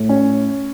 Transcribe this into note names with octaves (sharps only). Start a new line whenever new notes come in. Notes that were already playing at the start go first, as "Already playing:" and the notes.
Already playing: A2
C#4